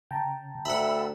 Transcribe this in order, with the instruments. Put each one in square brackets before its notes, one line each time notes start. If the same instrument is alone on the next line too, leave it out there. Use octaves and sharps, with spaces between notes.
[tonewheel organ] C#3 [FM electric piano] G5 A5 A#5
[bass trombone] D2 [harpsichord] E5 F#5 [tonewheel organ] B5 E6